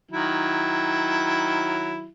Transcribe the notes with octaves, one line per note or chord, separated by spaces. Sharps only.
D#3 F#3 E4